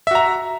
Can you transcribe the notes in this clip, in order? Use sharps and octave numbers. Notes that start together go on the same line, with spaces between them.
F#4 E5 A#5